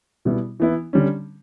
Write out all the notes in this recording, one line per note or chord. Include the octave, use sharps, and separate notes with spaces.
B2 G3 B3 E4
E3 B3 E4
D3 G3 C#4